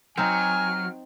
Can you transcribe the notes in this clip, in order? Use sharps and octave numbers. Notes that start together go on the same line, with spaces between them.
F#3 C4 D#4 G#5 F6